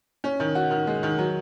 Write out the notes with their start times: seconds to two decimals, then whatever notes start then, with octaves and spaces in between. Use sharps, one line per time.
0.24 C#4
0.40 D#3
0.55 F#4
0.71 D#3
0.87 G#3
1.03 D#3
1.19 F#3